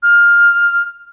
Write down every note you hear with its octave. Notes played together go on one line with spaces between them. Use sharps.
F6